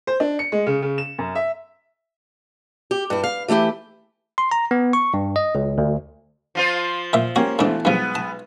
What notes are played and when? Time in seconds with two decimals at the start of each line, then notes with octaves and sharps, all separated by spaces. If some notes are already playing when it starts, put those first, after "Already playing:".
0.07 C5
0.20 D4
0.39 C#7
0.52 G#3
0.67 C#3
0.82 C#3
0.98 E7
1.19 F#2
1.35 E5
2.91 G4
3.10 G2 E4
3.24 F5
3.48 E3 A3 E4 G4
4.38 C6
4.51 A#5
4.71 B3
4.93 C#6
5.14 G2
5.36 D#5
5.55 C#2
5.78 D2
6.55 F3 F4 C5
7.13 A#2 E5
7.36 A#3 C#4 F#4 G4
7.59 G#2 B2 E3 A3 D4
7.85 B1 G2 F3 G#3 B3
8.15 A5